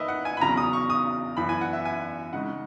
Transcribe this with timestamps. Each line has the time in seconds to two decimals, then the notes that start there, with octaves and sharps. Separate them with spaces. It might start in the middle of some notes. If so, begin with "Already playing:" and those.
Already playing: D#3 A#3 D#4 A#4 B4 D#5 E5
0.08 F#5
0.25 G#5
0.37 B5
0.40 E2 C#3 F#3 A#5
0.57 D#6
0.73 C#6
0.90 D#6
1.37 F#2 E3 B3 B5
1.49 G#5
1.61 F#5
1.73 E5
1.85 G#5
2.33 C#3 G#3 D#4 F#5